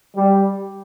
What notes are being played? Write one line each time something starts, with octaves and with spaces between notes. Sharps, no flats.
G3